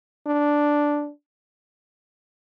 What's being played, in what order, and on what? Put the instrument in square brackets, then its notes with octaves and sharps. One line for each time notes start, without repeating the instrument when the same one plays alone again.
[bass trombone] D4